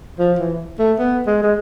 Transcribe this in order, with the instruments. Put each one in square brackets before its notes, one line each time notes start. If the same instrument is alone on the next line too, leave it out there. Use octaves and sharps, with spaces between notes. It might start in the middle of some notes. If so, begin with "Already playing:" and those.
[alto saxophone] F3
E3
A3
B3
G#3
G#3